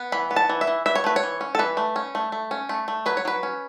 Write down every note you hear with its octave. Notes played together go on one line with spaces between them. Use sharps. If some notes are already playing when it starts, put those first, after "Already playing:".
Already playing: B3
E3 B5
B3
A5
E3
E5
E3
E3 E5
C#5
A3 B4
C#5
E3
C#4
A4
E3 B4
A3
C#4
A3
A3
C#4
A3
A3
F#3 B4
C#5
F#3 B4
C#4